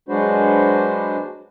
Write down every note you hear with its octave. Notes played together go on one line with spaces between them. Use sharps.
F#3 G#3 D4 F#4 B4 C5